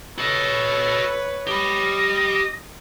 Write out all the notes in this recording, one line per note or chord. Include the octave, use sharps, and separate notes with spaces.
F#4 A4 B4 C#5 D#5
G4 D#5 B5